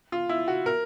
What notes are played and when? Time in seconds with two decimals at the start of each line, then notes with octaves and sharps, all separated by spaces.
0.12 F4
0.29 E4
0.48 F#4
0.66 A#4